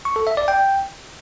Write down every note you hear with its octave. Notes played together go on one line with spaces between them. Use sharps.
C#6
A4
E5
D5
G5